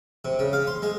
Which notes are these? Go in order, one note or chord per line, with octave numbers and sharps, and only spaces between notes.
C3
C#3
F5
C6
G#3